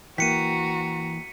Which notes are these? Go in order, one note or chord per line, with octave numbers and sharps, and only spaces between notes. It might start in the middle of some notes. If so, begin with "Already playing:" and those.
E3 A#3 F#4 G5 A#5 B6 C#7 D#7